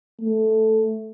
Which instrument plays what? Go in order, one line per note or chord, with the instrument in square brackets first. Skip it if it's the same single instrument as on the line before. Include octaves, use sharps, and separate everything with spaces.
[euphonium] A3